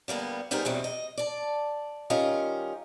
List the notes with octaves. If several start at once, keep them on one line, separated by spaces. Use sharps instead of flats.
D3 G3 A#3 B3
G3 B3 D#4 G#4 A#4 C5
E2 B2 F#3 G3 C4
D#5
D5 A5
D#3 G3 C#4 F4 A#4 D#5